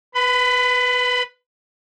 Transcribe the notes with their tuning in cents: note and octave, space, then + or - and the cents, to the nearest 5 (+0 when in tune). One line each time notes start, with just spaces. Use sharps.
B4 +0 B5 +30